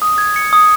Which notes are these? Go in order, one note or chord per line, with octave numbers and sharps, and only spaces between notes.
D#6
G#6
C#7
D#6